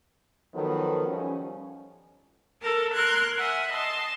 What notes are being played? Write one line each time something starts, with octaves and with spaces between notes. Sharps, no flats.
D#3 F3 F#3 B3 A4
F3 G3 C#4
A4 A#4 A5
A#4 C6 F#6 G#6
E5 F#5 G#5
D#5 A5 C6